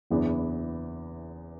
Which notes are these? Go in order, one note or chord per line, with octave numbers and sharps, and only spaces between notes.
F#1 E2 E3 B3 D4